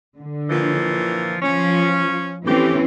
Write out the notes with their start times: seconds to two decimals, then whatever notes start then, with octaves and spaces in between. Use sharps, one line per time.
0.18 D3
0.49 A#2 E3 F3
1.41 F3 C#4
2.46 A2 E3 C4 C#4 G4